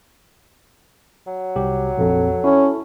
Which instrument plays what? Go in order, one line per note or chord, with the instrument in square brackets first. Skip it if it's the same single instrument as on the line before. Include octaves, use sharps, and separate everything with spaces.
[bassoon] F#3
[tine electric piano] C2 G4
[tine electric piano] A#1 F2 [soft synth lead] A4
[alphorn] C#4 [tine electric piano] E4